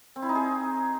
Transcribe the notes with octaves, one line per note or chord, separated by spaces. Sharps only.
C4
E4
D#4
G#4